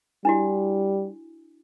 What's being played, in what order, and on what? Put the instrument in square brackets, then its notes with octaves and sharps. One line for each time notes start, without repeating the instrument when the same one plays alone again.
[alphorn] G3 [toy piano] D4 E4 F#4